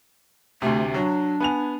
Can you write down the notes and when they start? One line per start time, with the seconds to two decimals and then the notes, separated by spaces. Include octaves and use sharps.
0.62 D2 C3 A3
0.94 F#3 D4
1.40 B3 G#5 F7